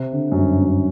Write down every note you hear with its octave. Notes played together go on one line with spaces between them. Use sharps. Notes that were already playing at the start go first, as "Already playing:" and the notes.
Already playing: C3
D3
F#2
G2
F#2